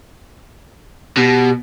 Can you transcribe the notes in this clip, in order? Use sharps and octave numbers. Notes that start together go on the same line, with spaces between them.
B2 G4